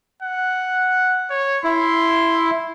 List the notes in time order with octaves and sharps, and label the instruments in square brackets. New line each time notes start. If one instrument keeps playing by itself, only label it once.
[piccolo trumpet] F#5
C#5
[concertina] E4 [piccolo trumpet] C6